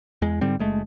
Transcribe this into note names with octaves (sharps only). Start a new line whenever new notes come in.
E2 G#3
G#2 D3 G3 C4
F#1 G#3 A3